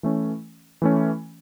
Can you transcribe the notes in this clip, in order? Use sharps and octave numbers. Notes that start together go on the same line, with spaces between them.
E3 A3 C#4
E3 A3 C#4